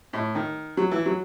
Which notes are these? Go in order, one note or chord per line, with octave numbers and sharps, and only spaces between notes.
A2
D#3
F#3
E3
F#3